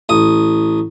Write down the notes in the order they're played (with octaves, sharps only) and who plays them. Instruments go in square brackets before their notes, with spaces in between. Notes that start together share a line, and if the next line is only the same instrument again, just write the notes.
[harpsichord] A1 D#6